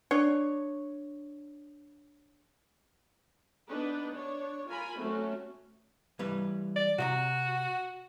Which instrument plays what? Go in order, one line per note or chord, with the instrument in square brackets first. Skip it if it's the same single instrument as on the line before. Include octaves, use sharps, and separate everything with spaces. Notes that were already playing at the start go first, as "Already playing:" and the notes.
[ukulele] D4 C#5
[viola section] B3 D4 D#4 B4
D4 C#5
F4 A#4 G#5 B5
F#3 A3 C4 C#4 F#4
[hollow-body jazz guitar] E3 G3 B4
[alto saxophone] D5
[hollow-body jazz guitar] C3 D#5 A#5 [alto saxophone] F#4